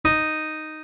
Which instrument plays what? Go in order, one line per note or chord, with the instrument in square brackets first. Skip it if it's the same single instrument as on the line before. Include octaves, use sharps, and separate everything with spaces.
[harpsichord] D#4